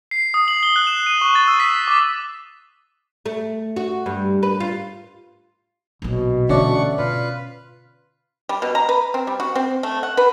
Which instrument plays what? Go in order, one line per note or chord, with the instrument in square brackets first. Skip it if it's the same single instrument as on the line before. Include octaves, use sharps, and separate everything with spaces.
[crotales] C7
D#6
F#7
G7
F#6
E7
D#7
C#6
A6
E6
B6
D6
[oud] A3
F#4
G2
B4
F4
[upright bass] A#1 F#3 [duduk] B2
[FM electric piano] D3 C#4 D5 [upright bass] E3 F#3 [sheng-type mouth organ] A3 F#5 C#6
[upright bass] B2 [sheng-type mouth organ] F4 B4
[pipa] G3
B2
A#5
B4
C4
G3
F#4
C4
A3
F#5
B4